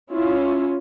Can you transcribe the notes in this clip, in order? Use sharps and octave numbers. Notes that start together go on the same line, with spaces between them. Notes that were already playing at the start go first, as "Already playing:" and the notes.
C#4 E4 F4